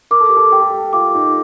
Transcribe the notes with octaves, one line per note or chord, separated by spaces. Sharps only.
A#4 D6
A4
G4
A4
G4 G5
A4
G4
F4 D6
D#4